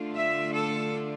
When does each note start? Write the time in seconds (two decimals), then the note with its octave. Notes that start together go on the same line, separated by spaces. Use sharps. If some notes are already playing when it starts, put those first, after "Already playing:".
Already playing: D3 A3 D4 F4
0.14 E5
0.52 A4